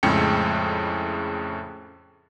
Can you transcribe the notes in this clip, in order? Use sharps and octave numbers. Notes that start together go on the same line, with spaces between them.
F2 A2 C#3 G#3 G5 C#7